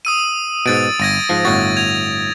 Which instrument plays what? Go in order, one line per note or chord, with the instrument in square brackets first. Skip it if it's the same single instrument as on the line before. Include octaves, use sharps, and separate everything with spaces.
[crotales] D#6 E6 D#7
[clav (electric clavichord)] G#2 B2 [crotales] A6 D7
[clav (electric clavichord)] G1 [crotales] G#6 A#6 D#7
[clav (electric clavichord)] G#2 F3
[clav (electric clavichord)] G1 A2 F#4 [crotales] A6 A#6
[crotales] G#6 F7